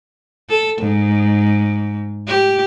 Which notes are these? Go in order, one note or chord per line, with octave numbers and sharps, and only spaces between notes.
A4
G#2
G4